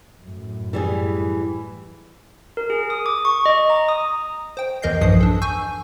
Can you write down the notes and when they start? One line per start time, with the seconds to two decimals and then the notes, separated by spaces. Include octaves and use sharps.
0.19 F#2 A2
0.73 E3 G3 G#4
2.57 A#4
2.70 G#4
2.90 D#6
3.06 D6
3.25 C#6
3.46 D#5
3.70 A#5
3.89 D#6
4.57 C5 G5
4.82 E2 E3 A#4 D#5 G6 C7
5.01 B1 G2 E3 F3 D#6 C7
5.21 D4 A4
5.42 G#5 C#6 E6 G6